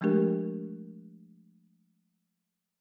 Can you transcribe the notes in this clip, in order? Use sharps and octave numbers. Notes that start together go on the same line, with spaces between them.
F3 G#3 A3 D4 G4 A#4